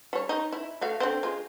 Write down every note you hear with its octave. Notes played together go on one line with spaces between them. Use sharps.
G3 C#5
D#4
E4
A3 F#4 F5
D3 C4
G#3 F4